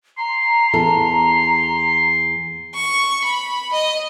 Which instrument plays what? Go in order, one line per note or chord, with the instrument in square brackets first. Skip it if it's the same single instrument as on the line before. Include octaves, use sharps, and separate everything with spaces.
[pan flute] A#5 [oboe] C6
[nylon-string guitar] E2 A4
[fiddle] C#6
B5
D#5